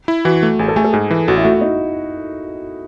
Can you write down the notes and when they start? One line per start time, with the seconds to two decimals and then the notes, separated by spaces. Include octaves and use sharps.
0.08 E4
0.25 E3 F#4
0.43 A3
0.59 A1 G#4
0.68 A4
0.76 A3 G#4
0.84 A4
0.93 G#2 G#4
1.11 E3
1.28 A1 F#4
1.37 E4
1.44 A3 F#4
1.53 E4
1.61 D#4